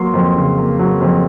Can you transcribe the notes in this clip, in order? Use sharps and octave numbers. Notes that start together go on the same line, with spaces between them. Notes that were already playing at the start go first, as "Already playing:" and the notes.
Already playing: F#3 A#3 C6
F2
C#3
A#3
F#3
F2